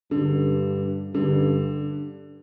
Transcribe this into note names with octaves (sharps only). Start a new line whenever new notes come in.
G2 D3
G2 D3